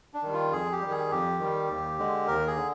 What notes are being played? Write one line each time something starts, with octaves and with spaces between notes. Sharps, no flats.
D4
D#3 G3
F4
F2 G#4
G4
D#3 G3
G#4
F2 G4
D#3 G3
D#2
D3 G#3
D#2 A#4
G#4
D3